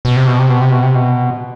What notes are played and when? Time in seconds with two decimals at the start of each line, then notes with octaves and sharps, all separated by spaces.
0.05 B2
0.16 C3
0.27 B2
0.39 C3
0.49 B2
0.61 C3
0.71 B2
0.83 C3
0.95 B2